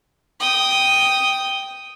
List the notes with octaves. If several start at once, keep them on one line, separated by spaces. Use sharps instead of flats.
G5 D#6